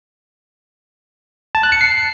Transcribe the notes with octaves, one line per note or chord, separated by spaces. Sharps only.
A5
F#6
C#7
C7